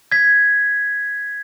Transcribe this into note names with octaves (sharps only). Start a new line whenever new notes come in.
G#6 B6